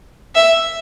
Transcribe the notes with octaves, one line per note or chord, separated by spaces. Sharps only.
E5